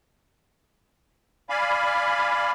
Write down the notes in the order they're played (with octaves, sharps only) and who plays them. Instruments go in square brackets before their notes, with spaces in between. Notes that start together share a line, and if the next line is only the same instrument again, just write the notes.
[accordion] D5 F5 G#5 B5